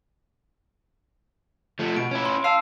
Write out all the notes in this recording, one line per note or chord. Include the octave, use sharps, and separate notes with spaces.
F3 A3
B2 D7
C#4 E4
C6
F5 A5 E6 C7